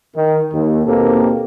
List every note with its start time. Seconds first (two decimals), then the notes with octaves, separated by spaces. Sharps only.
0.15 D#3
0.53 D#2
0.86 D#2 B2 A#3 C4 G4 A4